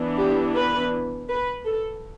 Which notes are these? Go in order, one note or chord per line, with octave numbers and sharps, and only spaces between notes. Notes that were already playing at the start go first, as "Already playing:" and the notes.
Already playing: E3 B3 D4
G4
B4
B4
A4